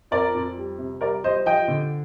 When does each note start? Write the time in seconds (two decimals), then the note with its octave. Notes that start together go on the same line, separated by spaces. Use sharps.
0.11 F2 A#4 D5
0.34 F2
0.57 G3
0.78 C3
1.01 G3 A#4 D5
1.24 G3 C5 D#5
1.46 F3 D#5 G5
1.68 D3